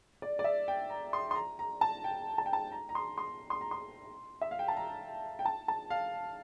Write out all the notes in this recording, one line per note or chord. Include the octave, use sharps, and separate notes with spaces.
D5
D5
E5
G5
A#5
C6
C6
A#5
A#5
A5
G5
A5
G5
A5
A#5
A#5
C6
C6
C6
A#5
C6
E5
F5
G5
A5
A#5
G5
A5
A5
F5